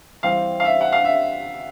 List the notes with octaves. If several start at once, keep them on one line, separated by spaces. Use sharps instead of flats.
E3 G3 C4 F5
F5
E5
F#5
F5
E5